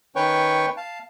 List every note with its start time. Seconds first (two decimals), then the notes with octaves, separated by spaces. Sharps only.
0.16 D#3 C#4 B4 C#5 G5 C#6
0.77 F5 A5